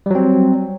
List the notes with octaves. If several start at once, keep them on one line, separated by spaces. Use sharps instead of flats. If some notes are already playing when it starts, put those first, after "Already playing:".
F#3 G3 C4